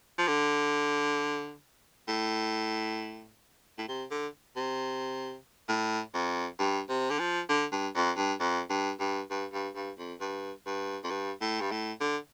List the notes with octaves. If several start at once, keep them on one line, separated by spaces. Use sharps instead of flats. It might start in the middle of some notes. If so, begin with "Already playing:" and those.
F3
D3
A2
A2
C3
D3
C3
A2
F2
G2
C3
D3
F3
D3
G2
F2
G2
F2
G2
G2
G2
G2
G2
F2
G2
G2
F2
G2
A2
G2
A2
D3